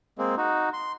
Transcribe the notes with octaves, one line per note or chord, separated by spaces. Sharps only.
G#3 A#3 C4
D#4 F#4
C6